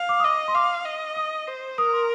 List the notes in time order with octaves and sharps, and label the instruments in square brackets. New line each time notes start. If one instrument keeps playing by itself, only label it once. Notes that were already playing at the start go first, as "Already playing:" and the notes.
Already playing: [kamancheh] F5
[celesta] D6
D#6
[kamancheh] D#5 [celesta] D6
[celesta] C6
[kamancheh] F5 [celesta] D6
[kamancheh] D#5
[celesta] D#6
[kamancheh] C5
[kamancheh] A#4 [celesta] D#6
[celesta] C6